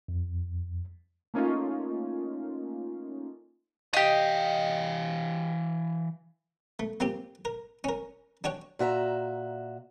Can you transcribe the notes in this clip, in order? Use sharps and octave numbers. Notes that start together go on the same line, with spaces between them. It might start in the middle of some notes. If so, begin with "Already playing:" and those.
F2
A3 A#3 C#4 D#4 F4
E3 G4 D#5 F5
A3
A#3 C4 F4 G4
A#4
C#4 A#4
D4 F#4 C#5 F#5 G5
A#2 F#4 E5 A#5